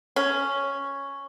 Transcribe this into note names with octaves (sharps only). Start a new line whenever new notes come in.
C#4